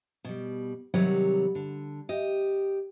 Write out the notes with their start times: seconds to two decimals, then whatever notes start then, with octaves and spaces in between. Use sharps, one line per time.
0.25 B2 G3
0.94 C3 D#3 F#3 G3 C#5 F#5
1.55 D3
2.09 G4 D#5